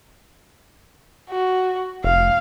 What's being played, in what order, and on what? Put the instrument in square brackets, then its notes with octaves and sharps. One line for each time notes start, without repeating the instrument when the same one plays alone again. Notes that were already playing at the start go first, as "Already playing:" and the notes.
[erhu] F#4
[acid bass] F1 [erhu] F5